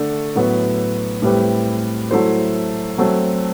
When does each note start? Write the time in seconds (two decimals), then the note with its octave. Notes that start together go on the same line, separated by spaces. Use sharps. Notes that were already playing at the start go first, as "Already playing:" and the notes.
Already playing: D3 A3 D4 A4
0.36 A2 F#3 B3 F#4
1.22 A2 G3 C4 G4 B4
2.11 F#3 A3 E4 A4 C5
2.98 F#3 A3 C4